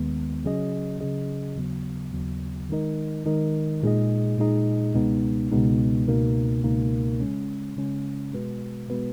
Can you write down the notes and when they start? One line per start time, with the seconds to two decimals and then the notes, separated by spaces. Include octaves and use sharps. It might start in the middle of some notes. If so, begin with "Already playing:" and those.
Already playing: D#2 D#3 G#3 B3
0.43 C#3 F#3 C#4 G#4 D#5
1.01 C#3 F#3 C#4 G#4 D#5
1.56 D#2 C#3 F#3 B3
2.13 D#2 C#3 F#3 B3
2.69 D#3 G#3 D#4 A#4 D#5
3.26 D#3 G#3 D#4 A#4 D#5
3.83 A#2 G#3 D#4 G#4 D#5
4.38 A#2 G#3 D#4 G#4 D#5
4.95 C#2 B2 G#3 B3 D#4
5.52 C#2 B2 G#3 B3 D#4
6.08 C#2 B2 A#3 D#4 A#4
6.64 C#2 B2 A#3 D#4 A#4
7.20 C#3 G#3 C#4
7.76 C#3 G#3 C#4
8.33 B2 G#3 B3 F#4 B4
8.90 B2 G#3 B3 F#4 B4